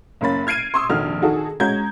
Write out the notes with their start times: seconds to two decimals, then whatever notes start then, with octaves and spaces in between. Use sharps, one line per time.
0.21 F#1 A#3 C#4 B5 A6
0.47 F6 G#6 C7 D7 D#7
0.74 C6 C#6 D#6 E6
0.89 F1 A#1 D#3 F#4 A4 F6
1.21 D#3 D#4 F#4 G#4 A4
1.60 G#3 C#4 F#4 A#5 G6 G#6